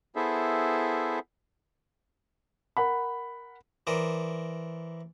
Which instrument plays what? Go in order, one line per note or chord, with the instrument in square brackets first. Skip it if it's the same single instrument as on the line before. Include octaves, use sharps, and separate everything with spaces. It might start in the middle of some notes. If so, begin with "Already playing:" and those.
[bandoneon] B3 E4 G#4 A4 C5 E5
[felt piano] A#4 F#5 B5
[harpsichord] E3 A#4 C5 D5 D#6